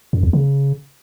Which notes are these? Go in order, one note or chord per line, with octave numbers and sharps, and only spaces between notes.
F#2
E2
C#3